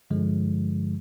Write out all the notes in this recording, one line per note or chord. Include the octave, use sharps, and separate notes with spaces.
G2 D3 F3 G#3